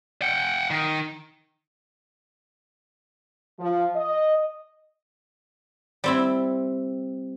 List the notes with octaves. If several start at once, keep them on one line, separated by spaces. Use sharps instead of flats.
F#5 G5
D#3
F3
D#5
G3 C4 E4